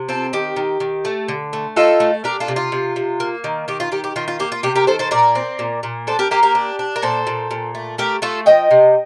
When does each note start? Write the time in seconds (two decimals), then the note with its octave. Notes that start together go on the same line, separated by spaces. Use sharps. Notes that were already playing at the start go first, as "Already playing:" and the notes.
Already playing: C3
0.08 C4 F4 A4
0.33 D#3 G4
0.56 D#3
0.80 D#3
1.05 A3
1.28 D3
1.53 A3
1.76 D#4 F4 A4
2.00 A3
2.24 D4 G4 A#4
2.40 F4 A4
2.48 C3
2.56 F4
2.72 C3
2.96 C3
3.20 A#3
3.44 D#3
3.68 D#3 G4
3.80 F4
3.92 D#3 G4
4.04 G4
4.16 D#3 F4
4.28 F4
4.39 A#3 G4
4.52 F4
4.63 C3 G4
4.75 G4 A#4
4.87 D#3 A4 C5
4.99 A4 C5
5.11 A#2 A#4 D5
5.35 C4
5.59 A#2
5.83 A#2
6.07 D4 A4 C5
6.19 G4 A#4
6.31 A#3 G4 A#4
6.43 G4 A#4
6.55 D4
6.79 D4
6.96 A#4
7.02 A#2 A4 C5
7.27 A#2
7.51 A#2
7.75 A3
7.98 A3 G4 A#4
8.22 A3 F4 A4
8.46 F3 D#5 G5
8.71 C3